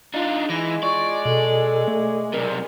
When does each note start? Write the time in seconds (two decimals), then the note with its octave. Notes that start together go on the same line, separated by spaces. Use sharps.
0.14 D4 D#4 F4
0.50 E3 G#3 A#6
0.83 F4 D5 C#6
1.25 B2 A4
1.88 A3
2.34 B1 C3 A#4 D5